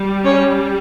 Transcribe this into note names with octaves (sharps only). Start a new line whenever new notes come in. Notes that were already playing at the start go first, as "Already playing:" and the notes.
Already playing: G3
C#4 C#5